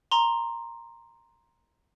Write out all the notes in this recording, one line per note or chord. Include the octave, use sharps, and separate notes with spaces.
A#5 C6